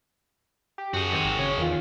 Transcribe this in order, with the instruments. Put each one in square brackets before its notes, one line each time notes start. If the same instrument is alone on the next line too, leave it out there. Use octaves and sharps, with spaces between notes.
[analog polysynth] G4
[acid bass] F#2 [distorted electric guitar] F#4 G#4
[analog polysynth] D#3 C4 G#5
[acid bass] G#1
[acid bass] C#3 [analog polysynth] C#5
[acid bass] E2 [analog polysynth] D#3 F4